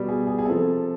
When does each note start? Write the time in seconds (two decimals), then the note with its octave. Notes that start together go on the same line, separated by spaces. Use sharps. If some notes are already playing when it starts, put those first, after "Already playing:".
Already playing: B2 G3
0.08 G#4
0.27 G#4
0.39 G#4
0.45 C3 F3 A4